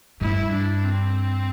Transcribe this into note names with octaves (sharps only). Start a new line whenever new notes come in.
G2 E4
D4
C4